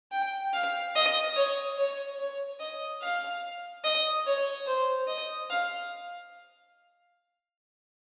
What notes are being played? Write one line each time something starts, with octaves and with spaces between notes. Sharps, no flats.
G5
F5
D#5
C#5
C#5
C#5
D#5
F5
D#5
C#5
C5
D#5
F5